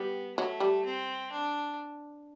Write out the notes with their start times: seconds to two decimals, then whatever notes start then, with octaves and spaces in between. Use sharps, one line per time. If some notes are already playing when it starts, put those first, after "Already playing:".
Already playing: G3 B3
0.37 F#3 A3
0.60 G3
0.85 C4
1.32 D4